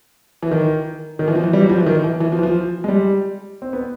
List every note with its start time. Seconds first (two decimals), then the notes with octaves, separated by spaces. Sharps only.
0.43 E3
0.51 D#3
1.19 D#3
1.28 E3
1.35 F3
1.44 E3
1.53 G3
1.61 F#3
1.70 F3
1.78 E3
1.86 D#3
2.04 E3
2.20 E3
2.32 F3
2.39 E3
2.43 F3
2.84 G#3
2.88 G3
3.62 C4
3.73 B3